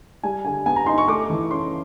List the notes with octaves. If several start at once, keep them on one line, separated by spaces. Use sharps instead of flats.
G3 G#5
D3 G#5
B3 G#5
A#5
D#4 C6
C#6
A3 D6
E3
C#4 C6